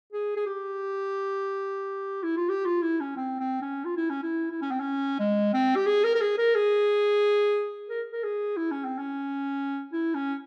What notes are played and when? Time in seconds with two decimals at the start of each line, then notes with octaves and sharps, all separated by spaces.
0.12 G#4
0.36 G#4
0.46 G4
2.23 E4
2.37 F4
2.49 G4
2.65 F4
2.82 E4
3.00 C#4
3.17 C4
3.39 C4
3.62 C#4
3.85 F4
3.97 E4
4.10 C#4
4.23 E4
4.51 E4
4.62 C#4
4.71 C4
4.80 C#4
5.19 G#3
5.53 C4
5.76 G4
5.86 G#4
6.04 A#4
6.15 A#4
6.21 G#4
6.38 A#4
6.55 G#4
7.89 A#4
8.12 A#4
8.24 G#4
8.57 E4
8.71 C#4
8.85 C4
8.99 C#4
9.93 E4
10.14 C#4